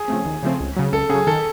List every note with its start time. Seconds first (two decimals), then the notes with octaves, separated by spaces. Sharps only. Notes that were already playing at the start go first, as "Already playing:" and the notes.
Already playing: G#4
0.08 C#3 F3 A3 C4
0.26 D#2
0.43 C#3 F3 A3 C4
0.60 C#2
0.76 C#3 F#3
0.92 C#2 A4
1.09 C#3 F#3 G#4
1.27 D#3 A4